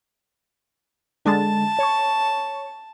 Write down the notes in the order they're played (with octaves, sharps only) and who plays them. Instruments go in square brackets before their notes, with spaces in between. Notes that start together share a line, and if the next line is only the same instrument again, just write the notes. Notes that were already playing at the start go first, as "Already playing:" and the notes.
[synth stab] D3 G#3 A6 [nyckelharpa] A5
[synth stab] C#5 C#6